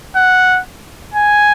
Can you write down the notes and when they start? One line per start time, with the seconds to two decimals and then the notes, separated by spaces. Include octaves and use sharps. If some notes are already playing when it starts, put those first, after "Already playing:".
0.16 F#5
1.14 G#5